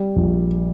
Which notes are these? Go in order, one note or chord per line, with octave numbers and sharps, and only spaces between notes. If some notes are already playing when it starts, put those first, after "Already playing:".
Already playing: G3
A#1